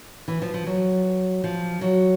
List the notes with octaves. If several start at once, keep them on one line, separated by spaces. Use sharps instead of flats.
E3
F3
F3
F#3
F3
F#3